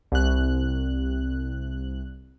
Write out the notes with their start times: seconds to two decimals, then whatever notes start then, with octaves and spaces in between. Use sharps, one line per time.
0.12 C2 F#6